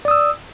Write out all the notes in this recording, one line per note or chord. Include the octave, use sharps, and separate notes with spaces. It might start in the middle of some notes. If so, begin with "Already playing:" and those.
D5 D#6 E6